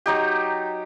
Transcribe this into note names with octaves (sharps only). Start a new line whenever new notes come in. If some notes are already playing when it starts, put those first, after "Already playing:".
F#3 D#4 G4